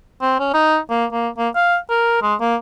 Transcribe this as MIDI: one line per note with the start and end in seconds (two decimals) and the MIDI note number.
0.22 0.35 60
0.39 0.52 61
0.54 0.77 63
0.90 1.05 58
1.12 1.29 58
1.38 1.49 58
1.56 1.77 77
1.90 2.21 70
2.22 2.34 56
2.40 2.56 58